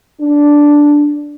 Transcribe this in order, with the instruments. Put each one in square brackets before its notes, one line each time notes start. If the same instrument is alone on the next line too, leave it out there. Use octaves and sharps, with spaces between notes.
[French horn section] D4